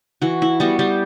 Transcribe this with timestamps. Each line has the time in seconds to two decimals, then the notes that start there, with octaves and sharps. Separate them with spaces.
0.22 E3 F#4
0.42 E4
0.60 G3 B3 F#4
0.79 G3 G4